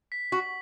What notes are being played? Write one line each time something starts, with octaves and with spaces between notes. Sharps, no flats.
B6
F#4 F#7